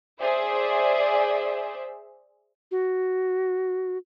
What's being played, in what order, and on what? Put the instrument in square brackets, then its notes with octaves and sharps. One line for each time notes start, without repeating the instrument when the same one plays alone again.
[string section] G#4 C5 D5 E5
[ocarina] F#4